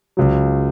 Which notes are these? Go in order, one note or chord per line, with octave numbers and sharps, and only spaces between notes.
C#2 C#3 F#3